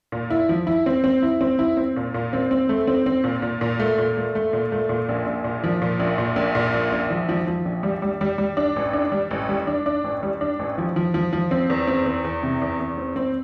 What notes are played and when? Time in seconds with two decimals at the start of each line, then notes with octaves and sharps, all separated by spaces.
0.12 A#2
0.30 E4
0.49 F3
0.67 E4
0.86 C4
1.04 C4
1.23 E4
1.41 C4
1.59 E4
1.77 C4
1.96 A#2
2.14 A#2
2.33 C4
2.51 C4
2.69 A3
2.87 C4
3.06 C4
3.24 A#2
3.42 A#2
3.61 A#2
3.80 A3
3.98 A#2
4.17 A3
4.35 A3
4.53 A#2
4.72 A3
4.89 A#2
5.09 A#1
5.26 A#1
5.44 A#2
5.64 F3
5.82 A#2
6.00 A#1
6.18 A#2
6.36 A#1
6.55 A#2
6.74 A#1
6.92 A#1
7.10 F3
7.29 F3
7.47 F3
7.65 A#1
7.83 G3
8.02 G3
8.21 G3
8.38 G3
8.57 D4
8.76 A1
8.93 D4
9.12 G3
9.31 A1
9.49 G3
9.67 D4
9.86 D4
10.04 A1
10.23 G3
10.41 D4
10.59 A1
10.78 F3
10.96 F3
11.14 F3
11.33 F3
11.51 C4
11.70 E2
11.87 C4
12.06 E2
12.24 E2
12.43 C3
12.61 E2
12.79 E2
12.98 C4
13.16 C4